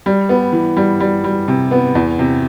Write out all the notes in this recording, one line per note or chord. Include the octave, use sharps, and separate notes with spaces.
G3
B3
E3
G3
G3
G3
C3
B3
E2
C3